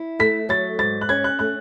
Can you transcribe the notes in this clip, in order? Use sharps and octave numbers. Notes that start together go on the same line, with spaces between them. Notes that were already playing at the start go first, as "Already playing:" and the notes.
Already playing: E4
A3 B6
F#3 A6
G#2 A6
F#6
C#4 G#6
F#6
A3 F#6